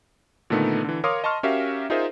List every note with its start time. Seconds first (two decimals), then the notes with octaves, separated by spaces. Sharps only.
0.50 A#2 D3 D#3 A3 B3 D#4
0.84 D3 E3
1.04 A#4 C#5 F5 C6 D6 D#6
1.24 D#5 A5 C6 C#6 F6
1.43 C#4 F#4 G4 A#4 E5 F5
1.90 D#4 F4 G#4 A#4 C5 E5